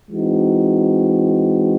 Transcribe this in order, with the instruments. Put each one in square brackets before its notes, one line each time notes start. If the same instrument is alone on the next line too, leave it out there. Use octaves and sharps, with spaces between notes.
[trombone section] E3 G#3 C4 D#4 F#4